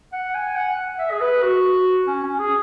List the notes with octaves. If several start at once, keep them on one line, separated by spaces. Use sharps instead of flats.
F#5
G#5
F#5
E5
G#4
B4
F#4
C#4
C#4
G#4